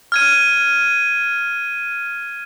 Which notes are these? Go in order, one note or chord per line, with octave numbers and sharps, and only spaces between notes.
F6 G#6 D#7